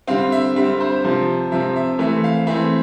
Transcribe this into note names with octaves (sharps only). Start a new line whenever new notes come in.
D3 G3 C4 F5
E5
D3 G3 C4 E5
C5
C3 F3 C4
C3 F3 C4 E5
E5
E3 A3 C4 E5
F5
E3 A3 C4 E5